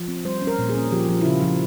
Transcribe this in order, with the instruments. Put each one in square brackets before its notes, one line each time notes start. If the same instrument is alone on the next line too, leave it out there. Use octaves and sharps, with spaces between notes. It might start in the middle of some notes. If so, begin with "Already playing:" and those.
Already playing: [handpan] F3
C4
G3 C5
C#4
A#4
A#2
G#4
C#4
F3 G4
F3
E4
C#3 F4
F3